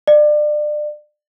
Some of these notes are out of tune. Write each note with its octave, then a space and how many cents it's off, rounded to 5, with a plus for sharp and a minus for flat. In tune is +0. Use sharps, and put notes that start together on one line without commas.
D5 +30